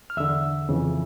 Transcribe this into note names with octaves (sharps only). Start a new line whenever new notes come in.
F6
E2 D3 E5 E6
F2 C#3 E3